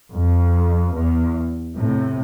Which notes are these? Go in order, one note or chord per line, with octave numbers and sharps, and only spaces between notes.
F2
E2
A2 C3